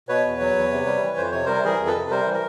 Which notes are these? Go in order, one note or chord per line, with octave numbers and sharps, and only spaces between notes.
B2 B4 C#5
E2
F#3
E2
C3
G3
E3
F2 C5
C3 C#5
G3 A#4 C5
E3 G#4 A#4
F2
A4 B4
C3
G3 A#4 C5
E3
A#4